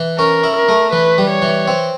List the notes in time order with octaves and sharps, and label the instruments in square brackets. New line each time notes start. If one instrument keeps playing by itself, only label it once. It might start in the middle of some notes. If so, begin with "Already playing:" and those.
Already playing: [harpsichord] E3
[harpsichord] C#4 [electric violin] A#4
[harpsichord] E4
[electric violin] A#4
[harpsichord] A3
[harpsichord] E3 [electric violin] B4
[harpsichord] G3
[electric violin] C#5
[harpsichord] E3
C4